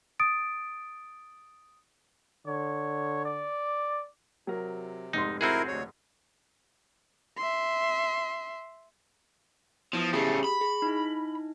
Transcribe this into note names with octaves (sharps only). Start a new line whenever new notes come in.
D#6 A6 D7
D3 C#5
D5
C3 F#3 A#4
F1 G#2 D#4 C6
C4 E4 F#4 G#4 A#4
D2 C#5
E5 C6
F3 B3 E4 D#6
C#3 A3 G4 G#4
B5
G#4
D#4 E4